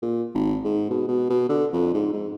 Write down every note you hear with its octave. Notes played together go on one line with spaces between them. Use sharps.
A#2
G#1
G#2
B2
B2
B2
D3
F2
G#2
G#2